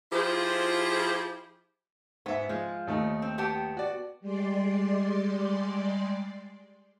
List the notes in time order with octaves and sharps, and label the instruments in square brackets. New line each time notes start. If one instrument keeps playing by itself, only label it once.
[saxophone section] F3 E4 F4 G4 G#4 C5
[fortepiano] G#2 E5 [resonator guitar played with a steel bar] B3
[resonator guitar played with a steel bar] F3 [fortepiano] G#3
[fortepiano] D#2 A3 D#4
[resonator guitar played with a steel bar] C4
B3 G4 A5
[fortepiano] F#4 D5
[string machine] G3 G#3 D5 C6